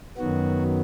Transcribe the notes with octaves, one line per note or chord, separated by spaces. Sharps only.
F#2 D#3 F#3 B3 F#4